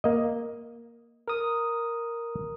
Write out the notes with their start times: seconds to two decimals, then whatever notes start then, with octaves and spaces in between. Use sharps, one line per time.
0.04 A#3 D#5
1.28 A#4 D#6